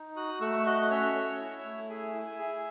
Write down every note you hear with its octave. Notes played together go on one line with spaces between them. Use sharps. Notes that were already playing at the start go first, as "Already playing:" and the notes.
Already playing: D#4
F#4 D#6 F#6
A3 C#6 E6
F#4 D#5 F#5
F#5
C#4 C#5 E5
C#4
E4
A3
G#4 E5 G#5
E4
G#4